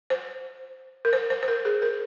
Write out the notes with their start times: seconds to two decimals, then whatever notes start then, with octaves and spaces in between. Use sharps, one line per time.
0.10 C5
1.05 A#4
1.13 C5
1.30 C5
1.43 C5
1.48 A#4
1.65 G#4
1.82 A#4